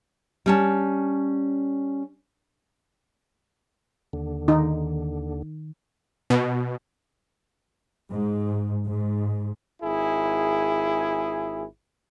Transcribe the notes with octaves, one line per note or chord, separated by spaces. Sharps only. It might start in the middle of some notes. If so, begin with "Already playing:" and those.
G3 C#4 A5
D#2 D3
D#3 D#4
B2
G#2
G#2
G#1 E4 G#4